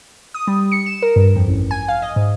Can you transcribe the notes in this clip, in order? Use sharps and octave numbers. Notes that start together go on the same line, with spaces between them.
D#6
G3
C#7
E7
A#4
G2
F2
A1
G#5
F5
D#5
G#2